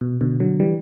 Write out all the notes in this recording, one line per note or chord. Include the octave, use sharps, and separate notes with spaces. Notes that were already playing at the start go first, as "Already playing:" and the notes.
B2
B2 D3
D3 F#3
E3 G3